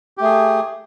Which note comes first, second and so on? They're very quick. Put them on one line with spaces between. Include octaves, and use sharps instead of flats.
G4 A3 G#4